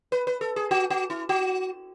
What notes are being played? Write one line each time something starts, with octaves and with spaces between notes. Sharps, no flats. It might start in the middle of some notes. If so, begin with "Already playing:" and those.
B4
B4
A4
G#4
F#4
F#4
E4
F#4